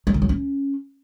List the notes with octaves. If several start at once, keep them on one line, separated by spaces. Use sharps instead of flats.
F#3
D#3
F#3
C#4